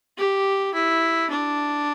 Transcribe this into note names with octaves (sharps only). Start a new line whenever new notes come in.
G4
E4
D4